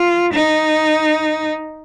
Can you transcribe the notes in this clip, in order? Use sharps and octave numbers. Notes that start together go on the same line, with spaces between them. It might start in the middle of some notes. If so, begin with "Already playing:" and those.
Already playing: F4
D#4